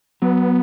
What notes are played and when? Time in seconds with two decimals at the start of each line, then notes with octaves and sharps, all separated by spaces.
0.22 F#3 B3